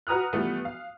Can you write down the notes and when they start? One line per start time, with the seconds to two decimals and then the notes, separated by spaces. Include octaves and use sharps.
0.07 F#4 B4 A#5 D#6 F6 F#6
0.33 E3 F3 G3 A3 B3
0.65 F5